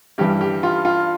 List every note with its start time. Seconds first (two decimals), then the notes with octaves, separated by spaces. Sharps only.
0.18 G2 E3 G3 G4
0.41 G4
0.63 F4
0.85 F4